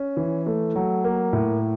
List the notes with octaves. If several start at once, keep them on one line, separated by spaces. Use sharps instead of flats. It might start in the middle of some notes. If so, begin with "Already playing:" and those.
Already playing: C#4
E3
A3
F#3
A#3
A2